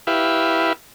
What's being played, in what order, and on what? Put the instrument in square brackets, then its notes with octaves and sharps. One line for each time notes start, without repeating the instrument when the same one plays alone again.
[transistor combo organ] E4 G4 B4 E5 F5